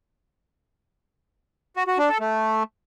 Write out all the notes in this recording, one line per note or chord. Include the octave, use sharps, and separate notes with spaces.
F#4
F#4
D4
A4
A3